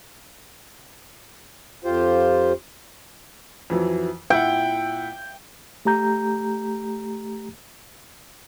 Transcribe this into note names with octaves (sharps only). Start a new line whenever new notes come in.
F2 F4 G4 C5
F2 E3 F#3
A#2 E4 F#5 G5
A3 G4 A#5 G6